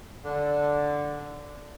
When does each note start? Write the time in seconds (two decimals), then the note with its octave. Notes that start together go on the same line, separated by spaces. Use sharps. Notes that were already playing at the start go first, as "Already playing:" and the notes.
0.24 D3